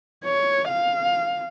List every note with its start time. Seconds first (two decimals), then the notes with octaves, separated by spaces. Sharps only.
0.25 C#5
0.68 F5